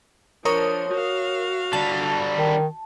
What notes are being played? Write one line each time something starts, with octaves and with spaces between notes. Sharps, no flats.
F3 D4 A#4 C#5 D#6
F#4 F5
D3 G3 A5
D#3